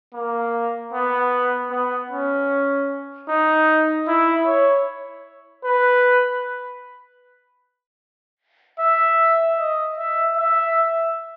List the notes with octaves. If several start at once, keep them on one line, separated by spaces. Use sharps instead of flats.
A#3
B3
B3
C#4
D#4
E4
C#5
B4
E5
D#5
E5
E5